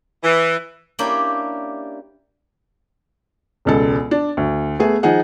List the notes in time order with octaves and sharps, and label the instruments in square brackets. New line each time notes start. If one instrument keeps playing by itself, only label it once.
[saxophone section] E3
[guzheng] A#3 C#4 D4 E4 G4
[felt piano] E1 C#2 A4
D4
D2
A3 B3 G#4
F3 D#4 G#4 F#5